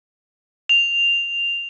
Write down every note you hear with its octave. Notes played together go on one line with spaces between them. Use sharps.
F7